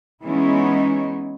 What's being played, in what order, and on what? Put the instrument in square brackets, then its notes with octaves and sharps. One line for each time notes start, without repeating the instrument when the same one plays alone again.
[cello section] E3 G#3 B3 C#4 D#4 E4